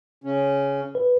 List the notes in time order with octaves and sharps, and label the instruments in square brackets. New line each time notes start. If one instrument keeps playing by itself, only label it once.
[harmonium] C#3 C#4
[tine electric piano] B4